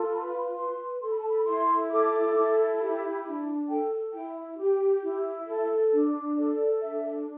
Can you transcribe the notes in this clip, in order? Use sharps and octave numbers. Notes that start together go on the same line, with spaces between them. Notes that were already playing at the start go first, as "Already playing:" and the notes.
Already playing: F4 A4
B4 B5
B4 C6
A4 C6
B5
A5
B5
E4 C6
A4 D6
E4
G4 B5
D4
A4 G5
E4 G5
G4
E4
A4
D4
A4 D5
D4 E5